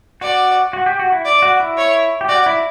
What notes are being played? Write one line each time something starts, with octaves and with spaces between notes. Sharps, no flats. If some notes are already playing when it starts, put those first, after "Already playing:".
F#4 D5
F#4
G4
F#4
E4
D5
F#4
E4
C#5
G4
F#4 D5
E4